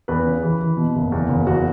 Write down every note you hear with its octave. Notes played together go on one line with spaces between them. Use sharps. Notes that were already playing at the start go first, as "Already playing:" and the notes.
E2 B4
C#3
E3
E3
B2
F#1
E2
F#1
E2 F#4